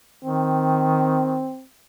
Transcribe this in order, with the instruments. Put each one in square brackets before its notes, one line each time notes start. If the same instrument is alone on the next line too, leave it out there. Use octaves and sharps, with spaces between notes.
[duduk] D#3 [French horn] C4